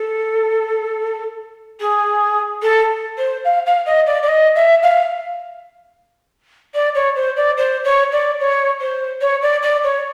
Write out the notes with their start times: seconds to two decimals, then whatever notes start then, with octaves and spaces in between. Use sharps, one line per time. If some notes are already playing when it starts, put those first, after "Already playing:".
Already playing: A4
1.80 G#4
2.62 A4
3.17 C5
3.44 F5
3.66 F5
3.86 D#5
4.06 D5
4.22 D5
4.28 D#5
4.55 E5
4.82 F5
6.74 D5
6.94 C#5
7.15 C5
7.36 D5
7.57 C5
7.84 C#5
8.12 D5
8.40 C#5
8.80 C5
9.21 C#5
9.42 D5
9.62 D5
9.83 C#5